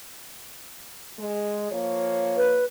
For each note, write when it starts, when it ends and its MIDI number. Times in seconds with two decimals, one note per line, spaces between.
1.19 1.71 56
1.71 2.63 53
1.71 2.63 58
1.71 2.63 73
2.37 2.65 71